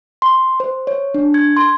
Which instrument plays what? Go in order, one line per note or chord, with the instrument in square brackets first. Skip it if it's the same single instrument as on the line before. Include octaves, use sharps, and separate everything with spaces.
[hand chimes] C6
C5
C#5
D4
G#6
C6